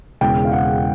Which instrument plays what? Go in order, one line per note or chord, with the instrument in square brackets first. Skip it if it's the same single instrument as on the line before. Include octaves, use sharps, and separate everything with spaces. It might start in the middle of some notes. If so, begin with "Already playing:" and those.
[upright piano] E1 E2 C#3 G5
F5
F#5